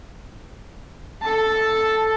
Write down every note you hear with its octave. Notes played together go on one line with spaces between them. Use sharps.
A4 A5